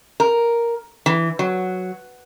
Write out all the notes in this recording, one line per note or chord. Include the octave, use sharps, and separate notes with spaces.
A#4
E3
F#3